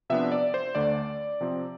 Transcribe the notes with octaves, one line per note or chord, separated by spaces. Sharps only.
C3 F3 B3 D4 E5
D5
C5
D2 D3 A3 D5
C3 F3 C4